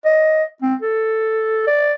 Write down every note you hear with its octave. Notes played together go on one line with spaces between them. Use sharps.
D#5
C4
A4
D5